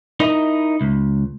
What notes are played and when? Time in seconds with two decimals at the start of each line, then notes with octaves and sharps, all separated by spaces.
0.20 D#4 E4 A#4 D#5
0.81 C#2